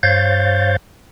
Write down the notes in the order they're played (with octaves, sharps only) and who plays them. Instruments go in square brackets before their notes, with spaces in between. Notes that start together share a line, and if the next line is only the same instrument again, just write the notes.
[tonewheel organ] G2 C5 C#5 F5 G6 A6